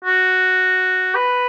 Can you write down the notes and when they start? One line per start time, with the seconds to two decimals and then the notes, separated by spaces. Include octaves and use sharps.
0.04 F#4
1.15 B4